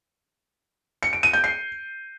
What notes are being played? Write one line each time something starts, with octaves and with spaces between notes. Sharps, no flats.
C#7
D7
D#7
G6
C7